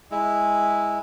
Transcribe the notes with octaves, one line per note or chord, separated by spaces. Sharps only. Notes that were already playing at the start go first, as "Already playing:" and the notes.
G#3 E4